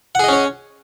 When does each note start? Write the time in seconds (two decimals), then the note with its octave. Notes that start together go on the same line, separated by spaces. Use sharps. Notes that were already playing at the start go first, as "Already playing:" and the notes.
0.15 F#5
0.19 G#4
0.24 D#5
0.28 C#4
0.33 C#5